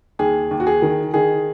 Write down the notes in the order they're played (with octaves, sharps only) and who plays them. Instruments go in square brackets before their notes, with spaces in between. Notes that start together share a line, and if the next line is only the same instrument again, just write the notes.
[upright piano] D#2 G#4
D#2
F#4
G#4
D#3
D#3 G#4